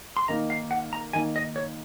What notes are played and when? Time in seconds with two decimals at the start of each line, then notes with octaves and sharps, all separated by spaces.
0.17 C6
0.28 D#3 A#3 D#4 A#5
0.50 F5
0.71 F#5
0.93 A#5
1.13 D#3 A#3 D#4 G#5
1.36 D#5
1.56 C#5